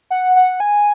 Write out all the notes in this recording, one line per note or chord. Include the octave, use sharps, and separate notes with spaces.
F#5
F#5
G#5